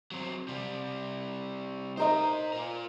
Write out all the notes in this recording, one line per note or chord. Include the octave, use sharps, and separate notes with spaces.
F#3 C4
C3 G3
D#4 A#4 C5 D#5 A#5
F4 A#4